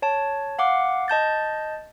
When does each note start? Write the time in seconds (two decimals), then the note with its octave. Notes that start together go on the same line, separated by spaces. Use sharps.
0.02 C#5 A5
0.59 F5 F#5 D6
1.08 D#5 A5 G6 A6